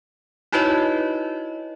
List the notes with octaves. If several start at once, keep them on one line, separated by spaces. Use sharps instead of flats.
D#4 E4 F#4 B4 C#5 D#5